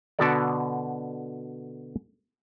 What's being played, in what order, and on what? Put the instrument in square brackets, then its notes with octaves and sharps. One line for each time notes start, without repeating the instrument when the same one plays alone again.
[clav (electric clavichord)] B2 D3 B3 F#4 A4 D5